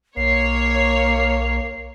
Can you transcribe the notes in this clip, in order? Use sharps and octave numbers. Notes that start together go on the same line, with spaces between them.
B1 A#3 C#5 C7